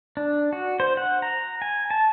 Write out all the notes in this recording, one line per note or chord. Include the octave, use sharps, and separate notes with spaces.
D4
F#4
C5
F#5
A#5
G#5
A5